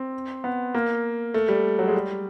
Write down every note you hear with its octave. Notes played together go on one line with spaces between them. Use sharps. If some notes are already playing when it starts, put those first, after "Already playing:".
Already playing: C4
B3
A#3
A3
G3
F#3
G#3
G3